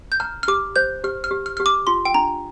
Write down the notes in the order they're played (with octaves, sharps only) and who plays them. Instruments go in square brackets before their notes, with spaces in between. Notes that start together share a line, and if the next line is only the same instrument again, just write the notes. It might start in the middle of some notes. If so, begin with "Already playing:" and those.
[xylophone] G6
[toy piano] A#5 [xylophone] F6
[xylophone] F6
[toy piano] G4 [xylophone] D6
[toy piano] C5 [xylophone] G6
[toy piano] G4 [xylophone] F6
[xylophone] F6
[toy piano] G4
[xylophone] F6
[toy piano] G4 [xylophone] F6
[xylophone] D6
[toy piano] F4 [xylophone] C6
[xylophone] G5
[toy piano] D4 [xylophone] A#5